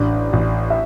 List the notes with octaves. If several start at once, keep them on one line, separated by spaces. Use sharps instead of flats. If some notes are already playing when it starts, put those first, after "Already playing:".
Already playing: A1 D4 D5
A1
E5